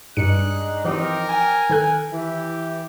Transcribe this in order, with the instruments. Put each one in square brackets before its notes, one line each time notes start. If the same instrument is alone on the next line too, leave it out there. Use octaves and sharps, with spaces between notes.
[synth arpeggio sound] G2 C#7 [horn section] G#3 D4 D#4 [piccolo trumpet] F#6
[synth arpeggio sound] E3 F3 [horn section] C4 D#4 G4 [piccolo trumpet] A#4
[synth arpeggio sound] G5 [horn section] G#5
[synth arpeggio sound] D#3 A4 F#6
[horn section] E3 [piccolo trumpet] G4